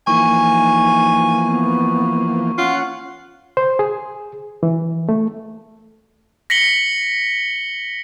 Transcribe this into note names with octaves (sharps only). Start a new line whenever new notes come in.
E3 F3 A#3 D#4 G#5 C#6
B3
C#4 F4 F#5
C5
G#4
E3
A3
A#6 B6 C#7 F#7 G7